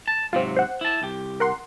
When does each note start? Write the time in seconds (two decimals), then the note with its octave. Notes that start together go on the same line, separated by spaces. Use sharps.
0.08 A5
0.33 G#2 C3 F#3 C4 F4
0.56 C5 F#5
0.81 E4 A5
1.02 C2 G4
1.40 A#4 F#5 C6